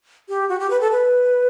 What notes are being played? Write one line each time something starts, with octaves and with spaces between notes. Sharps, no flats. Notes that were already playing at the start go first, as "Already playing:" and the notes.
G4
F#4
G4
B4
A4
B4